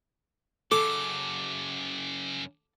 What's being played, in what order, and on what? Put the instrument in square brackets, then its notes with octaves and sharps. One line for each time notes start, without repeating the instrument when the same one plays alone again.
[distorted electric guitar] F#2 C#3 [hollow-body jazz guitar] A4 [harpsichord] D6